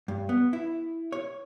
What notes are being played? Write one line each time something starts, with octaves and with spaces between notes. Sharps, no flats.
G2
B3
E4
C#5